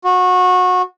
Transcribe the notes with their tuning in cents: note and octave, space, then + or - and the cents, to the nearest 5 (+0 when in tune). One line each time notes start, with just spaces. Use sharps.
F#4 -25